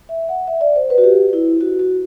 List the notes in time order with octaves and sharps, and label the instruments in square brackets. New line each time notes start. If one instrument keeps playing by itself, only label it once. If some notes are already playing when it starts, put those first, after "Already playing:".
[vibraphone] E5
F#5
E5
D5
C5
B4
F#4
G4
E4
F#4
F#4